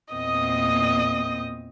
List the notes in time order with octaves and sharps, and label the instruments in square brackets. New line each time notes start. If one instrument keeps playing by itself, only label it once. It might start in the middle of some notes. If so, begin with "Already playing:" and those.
[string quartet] E2 A#2 A#3 C4 D#5 D#6